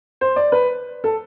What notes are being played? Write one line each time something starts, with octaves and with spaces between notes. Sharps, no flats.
C5
D5
B4
A4